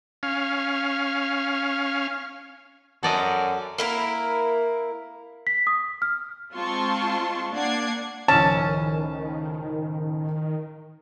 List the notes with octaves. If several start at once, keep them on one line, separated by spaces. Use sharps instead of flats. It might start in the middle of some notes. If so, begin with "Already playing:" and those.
C#4 F5
F#2 A4 D5 D#5 F#5
A#3 E4 A#4
B6
D#6
F6
G#3 C4 F4 A5 C6 C#6
A#3 D4 D5 F#5 G#6 C7
C#2 A2 D#3 F3 C#4 A5